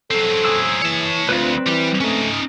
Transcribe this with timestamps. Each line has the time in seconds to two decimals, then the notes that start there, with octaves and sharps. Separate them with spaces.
0.11 F#3 C4 A4
0.45 G#4 E6
0.82 E3 C#5 A5
1.29 D2 C4 D4 F4 B4
1.67 E3 G3 G4
2.01 A3 C#4 D#4